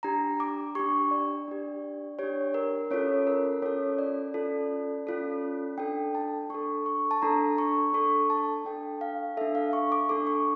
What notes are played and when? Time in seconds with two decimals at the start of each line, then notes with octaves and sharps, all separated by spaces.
0.03 D4 G4 A#5
0.40 D6
0.75 D4 G4 C#6
1.11 D5
1.48 D4 G4
2.19 D4 G4 C#5
2.54 A#4
2.91 C#4 F4 A4 C#5
3.27 A#4
3.62 C#4 F4 A4 C#5
3.99 D5
4.34 C#4 F4 A4
5.07 C#4 F4 A4
5.78 D4 A4 G5
6.15 A5
6.50 D4 A4 C#6
6.86 C#6
7.11 A5
7.22 D4 A4 A#5
7.58 C#6
7.93 D4 A4 C#6
8.30 A5
8.65 D4 A4 G5
9.01 F5
9.37 D4 A4 E5
9.55 F5
9.73 C#6
9.92 D6
10.09 D4 A4 D6
10.27 C#6